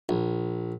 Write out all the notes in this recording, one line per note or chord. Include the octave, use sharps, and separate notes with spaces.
A#1